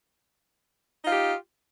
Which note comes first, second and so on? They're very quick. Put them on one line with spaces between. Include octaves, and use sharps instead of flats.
D#4 F4 G4